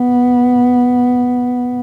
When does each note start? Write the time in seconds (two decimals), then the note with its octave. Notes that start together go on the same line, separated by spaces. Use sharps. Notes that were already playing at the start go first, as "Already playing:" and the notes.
Already playing: B3